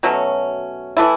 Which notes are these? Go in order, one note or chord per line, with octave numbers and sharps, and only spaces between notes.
B2 F#3 A3 C#4
E3 A3 E4